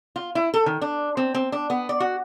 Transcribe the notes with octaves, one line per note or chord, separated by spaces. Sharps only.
F4
E4
A4
D#3
D4
C4
C4
D4
B3
D5
F#4